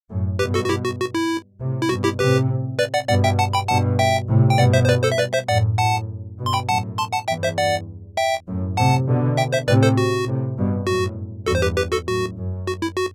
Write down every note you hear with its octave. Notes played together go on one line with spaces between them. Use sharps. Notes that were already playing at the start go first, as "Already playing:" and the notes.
F#2 A2
G2 B2 G4 B4
F#4 A4
F#4
E4 G4
F#4
F#4
E4
A2 C3
E4
G2 B2 F#4
E4 G4
A2 C3 G4 B4
B4 D5
D5 F#5
G2 B2 D5 F#5
E5 G5
F#5 A5
G5 B5
G2 B2 F#5 A5
E5 G5
A2 C3
G5
G2 B2 D5 F#5
C5 E5
C5
B4 D5
A4 C5
E5
B4 D5
C5 E5
F#2 A2 D5 F#5
F#2 A2 F#5 A5
G2 B2
C6
G5 B5
F#2 A2 F#5 A5
A5 C6
F#5 A5
E2 G2 E5 G5
C5 E5
D5 F#5
E5 G5
F#2 A2
A2 C3 F#5 A5
B2 D3
E5 G5
C5 E5
A2 C3 B4 D5
A4 C5
F#4
A2 C3
G2 B2
F#2 A2 F#4
E2 G2 F#4 A4
C5
G4 B4
G4 B4
F#4 A4
F#2 A2 F#4
F#2
F#4
E4
F#4